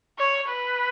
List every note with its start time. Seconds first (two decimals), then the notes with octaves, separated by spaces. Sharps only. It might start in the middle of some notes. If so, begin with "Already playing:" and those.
0.18 C#5
0.49 B4